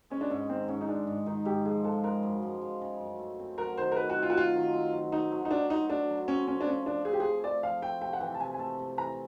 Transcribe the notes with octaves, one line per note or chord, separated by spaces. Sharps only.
G#3 C#4
D4
G#2 C#4
D#3 C4
G#2 C#4
D#4
G#3 D4
G#2
D#3 D#4
G#2 G4
F3 G#4
G#3 A4
C#3 A#4
F#2
F3
G#3
C#3
F#2
A3
C4
F#3 A#4
D#3 C5
A#4
A3 B4
F#4
C4
F4
F#4
F#3 F4
D#3
C4
F#3
A3 D#4
F#3
D#4
C4 D4
F#3 D#4
A3 D4
F#3
C4 C#4
F3 C#4
D4
A3 C#4
F3 D4
C4 G#4
G4
G#4
F3
A3 D5
F3 F5
A3 G5
C3 G5
F#5
E3 G5
A5
C3 G#5
G#5
A3 A5
C3
E3 A#5